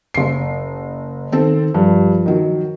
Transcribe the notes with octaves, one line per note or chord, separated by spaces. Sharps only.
F#1 C7
D#3 C4 A4
G2 F3
D#3 F#3